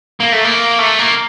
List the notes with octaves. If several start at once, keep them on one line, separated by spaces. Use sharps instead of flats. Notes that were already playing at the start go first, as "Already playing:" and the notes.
A#3
A3
A#3
A3
A#3